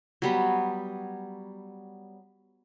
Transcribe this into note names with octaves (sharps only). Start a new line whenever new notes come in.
F#3 G3 B3